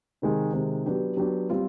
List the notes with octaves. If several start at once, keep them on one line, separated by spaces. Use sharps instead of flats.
C3 D#3 G#3
C3 D#3 G#3
F#3 B3 D4 G4
F#3 B3 D4 G4
G3 C4 F4